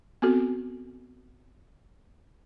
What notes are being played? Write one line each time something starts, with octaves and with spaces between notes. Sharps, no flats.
B3 C4 F#4 A4